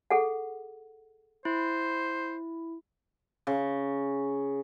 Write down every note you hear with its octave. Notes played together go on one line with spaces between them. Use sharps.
G#4 A4 F#5
E4 C5
C#3